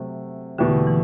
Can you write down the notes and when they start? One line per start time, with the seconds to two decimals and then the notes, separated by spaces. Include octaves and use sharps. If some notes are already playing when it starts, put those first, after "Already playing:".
Already playing: C3 F#3 A3
0.58 E2 B2 D3 A3 E4 G4
0.87 E3